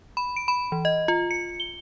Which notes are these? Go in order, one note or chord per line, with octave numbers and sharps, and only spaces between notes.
B5
D7
B5
E3
D#5
F4
C#7
G7